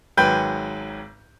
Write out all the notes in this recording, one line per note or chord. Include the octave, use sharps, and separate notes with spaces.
G#1 G#2 F#3 B4 G5 G6